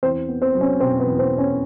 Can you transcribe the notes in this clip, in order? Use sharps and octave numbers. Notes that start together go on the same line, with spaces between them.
E2 C4 C5
B3
C4 C5
F#3
C#4 C#5
B2 C4 C5
B3 B4
E2
C4 C5
B3
C#4 C#5